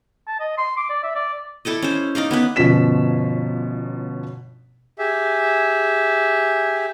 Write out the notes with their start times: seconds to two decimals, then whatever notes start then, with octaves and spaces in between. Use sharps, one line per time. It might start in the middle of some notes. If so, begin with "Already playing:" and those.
0.28 A5
0.40 D#5
0.58 C6
0.77 D6
0.89 D5
1.03 E5
1.15 D5
1.65 E4 A4 D5 D#5
1.82 C#4 C5
2.15 D#4 D5 D#5 F5
2.31 B3 C#4 B4
2.56 G1 B2 F3 C#4 B6 E7
4.99 G4 G#4 E5